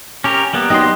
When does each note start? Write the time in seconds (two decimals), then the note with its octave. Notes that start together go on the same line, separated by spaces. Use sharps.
0.24 C#4 G4 A#4
0.53 G3 A#3 B3
0.70 F#3 D#4 D#5 G5 C6